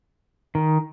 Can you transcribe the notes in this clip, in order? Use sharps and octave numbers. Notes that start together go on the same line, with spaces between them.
D#3